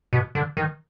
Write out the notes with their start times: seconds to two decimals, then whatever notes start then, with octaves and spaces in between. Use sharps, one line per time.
0.13 B2
0.35 D3
0.57 D#3